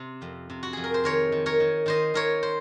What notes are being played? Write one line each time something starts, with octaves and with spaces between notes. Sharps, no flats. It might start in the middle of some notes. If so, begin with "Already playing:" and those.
Already playing: C3
F2
C3
F#4
F2 G#4
A#4
C5
D#3 A#4 C#5
D#3
A#4 C#5
D#3
D#3 C5 D#5
D#3 A#4 C#5
C5